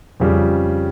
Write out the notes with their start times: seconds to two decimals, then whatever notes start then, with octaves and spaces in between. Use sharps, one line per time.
0.20 F2 C#3 G3